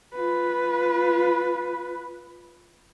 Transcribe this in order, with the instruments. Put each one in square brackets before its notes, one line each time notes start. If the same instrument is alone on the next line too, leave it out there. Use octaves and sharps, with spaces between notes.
[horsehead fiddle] F4 B4